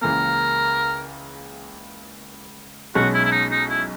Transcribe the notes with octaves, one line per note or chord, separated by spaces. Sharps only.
C#2 C#3 E3 A#3 A#4
B1 B2 G#3 C#4 F#4
E4
E4
D#4
D#4
E4